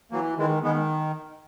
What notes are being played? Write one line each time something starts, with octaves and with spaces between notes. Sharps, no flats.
E3 F#3 A#3
D#3 E3 G#3
D#3 G#3 B3